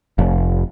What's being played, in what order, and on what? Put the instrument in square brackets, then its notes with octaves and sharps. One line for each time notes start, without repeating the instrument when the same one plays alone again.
[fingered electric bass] F1